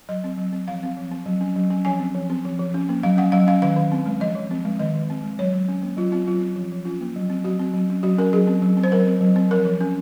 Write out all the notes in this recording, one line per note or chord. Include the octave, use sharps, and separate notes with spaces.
F#3 D#5
C4
F#3
C4
F3 F5
C4
F3
C4
F#3
C#4
F#3
C#4
F3 G#5
C4
F3
C4
F3
F3
C#4
A#3
F#3 F5
C#4 F#5
F#3 F5
C#4 F5
D#3 F5
D#3
C4
G#3
F3 D#5
F3
C4
G#3
D#3 D#5
D#3
C4
G#3
F#3 C#5
F#3
C#4
A#3
F#3 F4
C4 F4
F#3 F4
C4
F3
F3
C#4 F4
A#3
F#3
C4
F#3 F#4
C4
F#3
C#4
F#3 F#4
C#4 A#4
F#3 G#4
C4
F#3
C4
C5
F#3 A#4
C4
F#3
C4
F3 A#4
F3
C#4